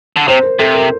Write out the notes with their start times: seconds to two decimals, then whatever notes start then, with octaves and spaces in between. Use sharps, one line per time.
0.16 D3
0.28 C3 C5
0.43 A#4
0.59 C3 A4
0.75 A#4